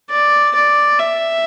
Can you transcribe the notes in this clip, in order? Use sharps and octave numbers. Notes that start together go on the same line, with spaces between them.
D5
D5
E5